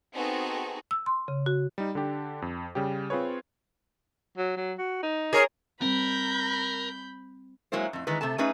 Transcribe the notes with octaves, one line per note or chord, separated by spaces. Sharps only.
B3 C4 D#4 F#4 G#4 A4
E6
C6
C#3
F#4
G3 D#4
D3 D4 G4
F2
C#3 G3 G4
C4 F4 G#4 B4 C#5
F#3
F#3
F#4
D#4
G#4 A#4 C#5
G3 C4 A#4 B5 G6
F#3 G#3 A#3 E4 C5
F2 A2
D#3 E3 G#3 B4
C3 A3 A4 A5
A3 C#4 D#4 G#4 B4